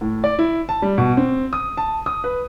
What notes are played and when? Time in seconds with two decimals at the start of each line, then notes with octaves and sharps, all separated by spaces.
0.01 A2
0.24 D5
0.39 E4
0.69 A5
0.82 G3
0.98 B2
1.17 C4
1.53 D#6
1.77 A5
2.06 D#6
2.24 B4